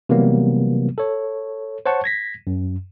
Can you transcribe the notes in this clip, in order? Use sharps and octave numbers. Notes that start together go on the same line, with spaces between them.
C3 E3 F#3 G3 A#3 B3
A4 C#5
C5 C#5 F#5 A5 C#6
G#6 A#6 B6
F#2